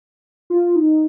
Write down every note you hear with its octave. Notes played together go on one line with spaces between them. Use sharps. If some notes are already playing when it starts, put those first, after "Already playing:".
F4
D#4